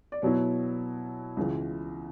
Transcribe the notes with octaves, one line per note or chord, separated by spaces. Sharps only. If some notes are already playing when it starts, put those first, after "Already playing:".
D5
B2 F#3 B3 E4 C#5
C#2 C#3 E3